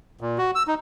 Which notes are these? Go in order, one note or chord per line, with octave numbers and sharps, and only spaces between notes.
A#2
F#4
E6
D#4